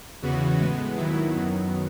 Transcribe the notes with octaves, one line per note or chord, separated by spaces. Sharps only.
E2 C#3 E3 B3 F#4
A2 G#3 B3
D#2 D#3 F#3 B3 E4
F#2 D#3 F#3 B3